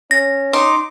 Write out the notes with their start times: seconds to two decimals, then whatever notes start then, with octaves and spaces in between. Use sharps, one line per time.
0.11 C#4 A#6
0.53 D#4 C6 D6